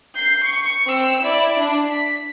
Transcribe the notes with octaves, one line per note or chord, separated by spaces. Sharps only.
G6 C7
C#6
C4 E6
E4 D5
D4
B6